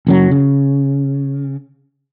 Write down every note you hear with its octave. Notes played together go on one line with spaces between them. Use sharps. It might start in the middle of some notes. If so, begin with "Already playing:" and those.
F#1 F#2 F#3
C#3